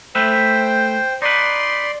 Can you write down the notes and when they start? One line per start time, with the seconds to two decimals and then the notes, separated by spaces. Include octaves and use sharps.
0.15 A3 B4 C5 E5 G5
1.22 D#4 B4 D5 C6